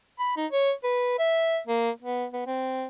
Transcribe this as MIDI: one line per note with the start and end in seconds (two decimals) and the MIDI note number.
0.19 0.34 83
0.37 0.46 63
0.52 0.71 73
0.84 1.15 71
1.19 1.59 76
1.67 1.90 58
2.02 2.25 59
2.33 2.42 59
2.47 2.86 60